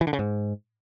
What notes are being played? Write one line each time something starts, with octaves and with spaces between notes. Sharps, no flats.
E3
D3
C#3
G#2